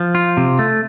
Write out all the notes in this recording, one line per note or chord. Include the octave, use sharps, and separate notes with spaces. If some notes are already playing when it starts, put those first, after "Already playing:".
Already playing: F3
F4
C3
A3